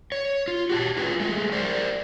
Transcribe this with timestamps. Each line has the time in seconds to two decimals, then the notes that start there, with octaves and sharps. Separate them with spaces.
0.12 C#5
0.48 F4
0.70 F#4 G4 A5
0.97 F4 G#4 B4
1.20 G#3 A3 G#4
1.52 A#4 C5 D5